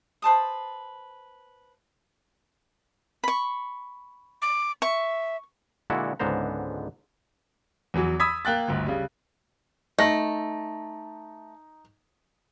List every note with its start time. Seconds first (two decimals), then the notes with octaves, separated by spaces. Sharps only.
0.22 B4 C5 A5 D#6
3.24 B5 C#6
4.42 D6
4.82 E5 C#6
5.90 A#2 D3 G#3 E4 F#4 A4
6.20 C#2 G#2 D3 B3 C5 A#5
7.94 E2 E3 F#3
8.20 B5 D#6 E6 G#6 B6
8.45 A#3 G5 F#6 A6
8.68 G1 D2
8.86 C#3 G3
9.98 A3 D#4 A#6 F#7